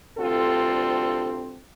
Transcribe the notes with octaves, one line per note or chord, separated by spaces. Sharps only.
D2 G2 C3 C4 F4 A4